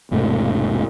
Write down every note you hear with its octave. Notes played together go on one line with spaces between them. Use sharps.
E1 G#2 C3 A3